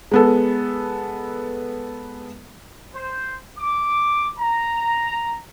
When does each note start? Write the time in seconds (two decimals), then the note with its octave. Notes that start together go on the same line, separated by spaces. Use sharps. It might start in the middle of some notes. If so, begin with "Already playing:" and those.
0.12 G#3 B3 A4
2.95 C5
3.58 D6
4.38 A#5